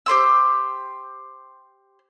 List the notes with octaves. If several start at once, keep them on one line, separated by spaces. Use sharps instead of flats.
G4 C5 C6 E6